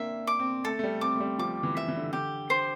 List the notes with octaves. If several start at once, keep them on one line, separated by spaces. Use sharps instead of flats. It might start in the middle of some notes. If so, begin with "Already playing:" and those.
Already playing: A#3 C4 D4 E5
D6
C4
A3 A4
A3
G3
C4 D6
A3
G3
F3 D6
E3
E5
E3
D3
D3 G4
C5